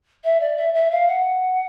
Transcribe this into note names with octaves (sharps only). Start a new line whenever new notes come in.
E5
D5
E5
E5
F5
F#5